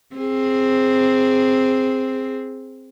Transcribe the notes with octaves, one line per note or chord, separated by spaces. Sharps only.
C4 G#4